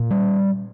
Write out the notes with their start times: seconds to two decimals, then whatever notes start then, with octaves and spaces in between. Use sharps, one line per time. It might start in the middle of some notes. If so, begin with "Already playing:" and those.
Already playing: A#2
0.11 G3